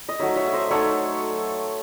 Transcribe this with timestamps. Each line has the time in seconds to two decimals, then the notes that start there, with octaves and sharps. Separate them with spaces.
0.09 D#5
0.19 F#3 A3 D#4 C#5 E5
0.36 C#5 E5
0.47 E5
0.53 C5 D#5
0.70 F#3 A3 D#4 A4 C#5